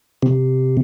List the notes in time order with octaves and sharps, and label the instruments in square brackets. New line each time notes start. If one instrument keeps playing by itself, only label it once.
[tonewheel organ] C3